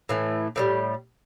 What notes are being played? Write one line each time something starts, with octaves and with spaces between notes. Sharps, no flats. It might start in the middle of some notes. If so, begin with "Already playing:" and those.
A2 E3 A3
A2 E3 G3